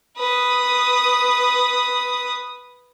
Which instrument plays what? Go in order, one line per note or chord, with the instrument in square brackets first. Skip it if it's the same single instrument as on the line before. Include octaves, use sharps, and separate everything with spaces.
[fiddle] B4 D#6